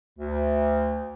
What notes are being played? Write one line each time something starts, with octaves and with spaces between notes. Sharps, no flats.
D2